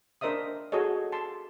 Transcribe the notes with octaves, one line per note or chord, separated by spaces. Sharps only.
D4 A#4 C5 D#5 E5 D#6
F#4 G#4 A4 C#5 D#5
A5 C6